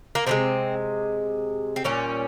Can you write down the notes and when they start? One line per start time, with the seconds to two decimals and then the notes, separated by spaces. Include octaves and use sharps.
0.15 A#3
0.27 C3 D#3 G#3 C4
1.76 C4
1.84 A#2 G3 C#4